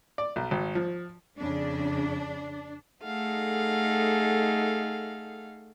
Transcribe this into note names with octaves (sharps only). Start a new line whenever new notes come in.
D5
B1
G#1
F3
F2 C#3 D4
A3 D#4 G#4 A4 F5 F#5